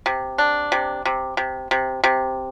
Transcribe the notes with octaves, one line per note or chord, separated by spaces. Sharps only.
C3
D4
C3
C3
C3
C3
C3